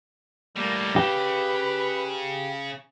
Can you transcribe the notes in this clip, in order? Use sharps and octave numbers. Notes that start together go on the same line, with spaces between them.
A2 G3 A#3
C#3 G4 B4